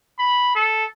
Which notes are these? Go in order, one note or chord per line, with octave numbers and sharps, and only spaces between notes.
B5
A4